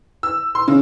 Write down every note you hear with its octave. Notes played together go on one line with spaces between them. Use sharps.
E6
C6
C#3